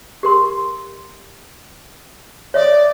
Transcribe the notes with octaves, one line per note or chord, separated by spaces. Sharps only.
G4 A#4 C6
C#5 D5 E5 D#6